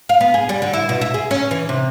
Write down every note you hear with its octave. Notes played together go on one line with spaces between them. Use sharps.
F5
B3
G#4
G3
D3
E4
B2
E5
G#4
C#4
E3
C3